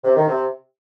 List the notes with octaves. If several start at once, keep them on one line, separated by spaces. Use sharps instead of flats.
C3
D#3
C3